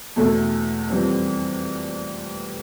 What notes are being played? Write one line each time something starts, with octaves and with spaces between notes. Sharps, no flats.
E2 B2 A3 E4 A4
F2 E3 G3 C4